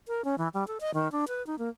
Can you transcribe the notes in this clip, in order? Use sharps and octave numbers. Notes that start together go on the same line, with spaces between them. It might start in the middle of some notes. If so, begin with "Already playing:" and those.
A#4
C#4
E3
G3
A4
D#5
D#3
D4
B4
D#4
A#3